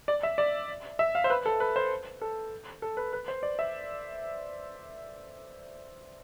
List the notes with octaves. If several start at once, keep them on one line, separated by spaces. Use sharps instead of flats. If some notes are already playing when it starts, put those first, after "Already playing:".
D5
E5
D5
E5
F5
C5
B4
A4
B4
C5
A4
A4
B4
B4
C5
D5
E5